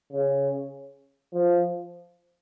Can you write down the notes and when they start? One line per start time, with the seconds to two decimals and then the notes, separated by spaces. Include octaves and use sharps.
0.12 C#3
1.34 F3